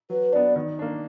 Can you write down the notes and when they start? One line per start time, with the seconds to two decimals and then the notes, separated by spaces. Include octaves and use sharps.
0.10 F#3 B4
0.32 B3 D4 D5
0.56 D#3
0.79 A#3 D4